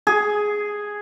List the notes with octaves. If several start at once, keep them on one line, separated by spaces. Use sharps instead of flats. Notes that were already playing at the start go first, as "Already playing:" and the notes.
G#4